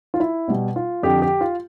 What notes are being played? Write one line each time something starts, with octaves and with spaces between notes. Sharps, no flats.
F4
E4
B2 G3
F4
F2 D3 F3 G4
G4
F4